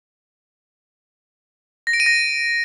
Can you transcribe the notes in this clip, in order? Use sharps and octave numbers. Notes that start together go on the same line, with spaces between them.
A#6
D7
D#7
A#6